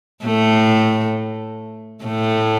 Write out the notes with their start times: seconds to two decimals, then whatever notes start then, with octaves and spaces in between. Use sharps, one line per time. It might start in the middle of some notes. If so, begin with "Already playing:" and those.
0.24 A2 A3
2.05 A2 A3